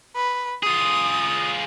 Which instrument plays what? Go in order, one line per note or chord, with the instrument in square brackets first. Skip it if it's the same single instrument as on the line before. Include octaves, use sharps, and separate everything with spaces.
[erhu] B4
[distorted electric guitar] F4 G#4 [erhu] D#6